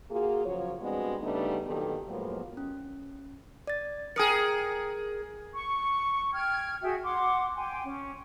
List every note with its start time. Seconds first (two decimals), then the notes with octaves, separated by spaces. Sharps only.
0.10 A#3 F4 F#4 G#4
0.46 C#3 F3 F#3 F4 C#5
0.82 G3 G#3 B3 C4 D4 F#4
1.22 C#3 G3 A3 B3 D4 D#4
1.67 A#2 D#3 F#3 B3 G4 A4
2.08 A2 F3 F#3 G#3 A#3 B3
2.57 C#4
3.67 D5 A6
4.16 G#4 A#4 G5 D#6 C#7
5.54 C#6
6.33 G5 F6 G#6
6.82 F#4 G#4 E5 G5
7.04 F#5 C6 D6
7.57 G5 G#5 C6
7.85 C#4